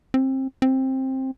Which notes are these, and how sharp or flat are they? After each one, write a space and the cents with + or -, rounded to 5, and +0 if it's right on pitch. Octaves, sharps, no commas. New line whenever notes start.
C4 +25
C4 +15